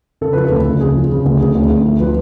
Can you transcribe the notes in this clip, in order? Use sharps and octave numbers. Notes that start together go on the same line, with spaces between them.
C#3 A4
F3 B4
A4
D2
C#3
C#3 G#4
F3
C#3
D2
D2 G#4
D2
D2
F3
F3 B4